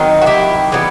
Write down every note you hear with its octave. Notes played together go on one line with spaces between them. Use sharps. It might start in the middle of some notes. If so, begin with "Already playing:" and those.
Already playing: D#3 F#3 C4 D#4
F#4
E4 G4
E3 G3 B3